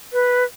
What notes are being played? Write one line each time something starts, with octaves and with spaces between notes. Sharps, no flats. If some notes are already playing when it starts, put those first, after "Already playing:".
B4